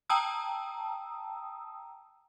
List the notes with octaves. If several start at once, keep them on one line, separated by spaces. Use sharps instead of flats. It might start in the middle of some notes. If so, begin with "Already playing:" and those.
G5 A5 A#5 D#6 E6